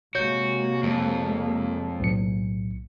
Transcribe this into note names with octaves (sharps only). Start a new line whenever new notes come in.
C3 G#3 A#3 F#4 C#5 G6
F2
B1 A2 C#7